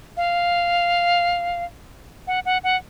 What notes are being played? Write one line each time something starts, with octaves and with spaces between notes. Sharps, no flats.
F5
F#5
F#5
F#5